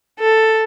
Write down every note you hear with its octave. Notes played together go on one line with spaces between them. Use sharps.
A4